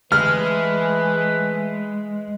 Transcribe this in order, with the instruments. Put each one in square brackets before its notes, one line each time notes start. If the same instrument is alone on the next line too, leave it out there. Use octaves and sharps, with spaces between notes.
[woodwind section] E3 A3 B4 [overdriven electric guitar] G#3 [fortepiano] F6